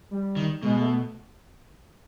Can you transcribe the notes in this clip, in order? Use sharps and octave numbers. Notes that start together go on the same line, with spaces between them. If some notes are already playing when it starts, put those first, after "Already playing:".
G3
D#3
B2 G#3
A3